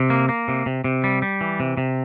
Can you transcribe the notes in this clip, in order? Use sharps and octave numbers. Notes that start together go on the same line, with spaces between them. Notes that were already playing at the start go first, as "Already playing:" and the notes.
Already playing: C3
A#3
A#3
C3
C3
C3
G3
G3
E3
C3
C3